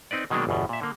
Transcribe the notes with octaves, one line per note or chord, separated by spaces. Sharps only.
C4 D#4 B4 D5
B2 D#3 F#3 G#3 A#3 D4
G1 E2 B2
A#2 E5
D3 A#3